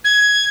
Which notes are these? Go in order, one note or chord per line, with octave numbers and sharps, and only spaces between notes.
G#6